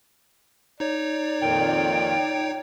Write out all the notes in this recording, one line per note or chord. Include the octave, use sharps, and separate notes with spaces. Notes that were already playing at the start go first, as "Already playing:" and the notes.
D#4 C#5 D5
F2 A#2 D#3 G5